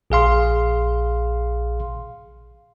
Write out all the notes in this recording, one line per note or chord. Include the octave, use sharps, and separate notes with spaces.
A#1 G#4 F5 C6